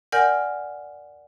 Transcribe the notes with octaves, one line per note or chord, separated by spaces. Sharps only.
A#4 D5 F#5 G#5 F6 G6